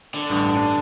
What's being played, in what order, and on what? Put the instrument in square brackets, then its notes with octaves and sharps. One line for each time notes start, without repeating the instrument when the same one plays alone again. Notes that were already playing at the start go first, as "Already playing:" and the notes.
[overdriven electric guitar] D3
[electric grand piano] A1 G2 D#6
D4